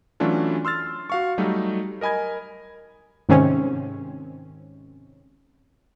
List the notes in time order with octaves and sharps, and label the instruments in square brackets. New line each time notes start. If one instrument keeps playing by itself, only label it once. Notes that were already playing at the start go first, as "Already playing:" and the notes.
[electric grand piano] E3 F#3 A3 C#4 D4 F4
C6 E6 F6 A6
F#4 F5 C#6
F#3 G3 A3 D#4
A#4 D#5 G#5 B5 G#6
[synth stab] G#2 C3 D#3 C4 C#4